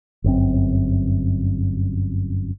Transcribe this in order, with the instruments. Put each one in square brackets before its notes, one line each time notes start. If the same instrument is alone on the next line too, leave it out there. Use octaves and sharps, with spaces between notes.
[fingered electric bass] G1 F#2 C4